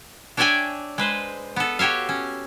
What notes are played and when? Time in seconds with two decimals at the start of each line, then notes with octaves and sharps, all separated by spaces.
0.37 D4 C#5 D5 E5 G5 G#5
0.98 G#3 B4 C5
1.56 B3 A4
1.79 F#4 G4 C#5 E5 F5
2.09 C#4